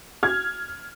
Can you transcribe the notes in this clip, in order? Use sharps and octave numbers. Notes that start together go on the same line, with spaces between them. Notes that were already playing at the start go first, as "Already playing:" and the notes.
F6 G#6